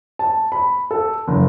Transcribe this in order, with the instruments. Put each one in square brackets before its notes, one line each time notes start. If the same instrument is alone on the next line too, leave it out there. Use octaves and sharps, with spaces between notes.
[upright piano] A5
B5
A4
F#1